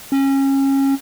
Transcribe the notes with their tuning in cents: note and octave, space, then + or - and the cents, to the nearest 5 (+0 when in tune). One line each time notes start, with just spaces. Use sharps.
C#4 -25